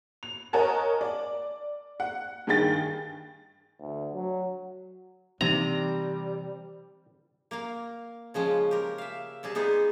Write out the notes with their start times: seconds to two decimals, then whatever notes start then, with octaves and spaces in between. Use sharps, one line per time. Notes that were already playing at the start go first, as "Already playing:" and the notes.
0.23 F7
0.53 A#4 C#5 D#5 F#5 G#5 A5
1.01 D5
2.00 F#5
2.47 G2 D#3 G#4 G5 A6
3.80 D2
4.14 F#3
5.41 C3 E3 G3 D#4 A#5
7.51 A#3 A#4 F5
8.34 C#3 F3 G#3 C#4
8.71 G4 A#4
8.98 E5 F5
9.43 C3 G3 G#4 A5
9.55 G#3 B3 D#4 G#4